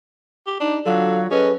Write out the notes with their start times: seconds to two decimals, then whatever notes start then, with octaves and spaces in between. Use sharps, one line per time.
0.47 G4
0.60 D4 D#4
0.86 D3 F#3 F4 F#4 F5
1.31 C#4 G#4 A4 B4 D#5